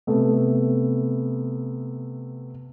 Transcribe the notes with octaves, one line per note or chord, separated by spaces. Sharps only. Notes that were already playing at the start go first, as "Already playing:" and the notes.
C3 A3 B3